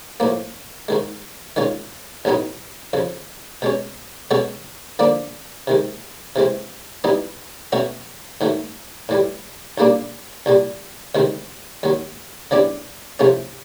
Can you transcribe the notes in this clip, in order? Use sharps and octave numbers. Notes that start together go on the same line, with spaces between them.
A2 F3 A#3
G#2 D#3 G#3
D#3 G#3 C#4 F4
A1 A2 F#3 B3 D#4
F2 C#3 F3
B2 G#3 C#4
B2 G#3 C#4 F#4 A4
D3 F3 A#3 D4
C3 D#3 G#3
C3 E3 G#3 C4
E3 G3 B3 D#4
B2 F#3 A3 C#4 F#4
G#2 D#3 F#3 A3
A2 E3 G3
B1 A#2 G3 A#3 D4
C2 A#2 G3
D2 C3 D#3 G#3 C4
D#2 D#3 F#3
C#3 E3 G3 B3 D4
C2 C3 F3 A3 C#4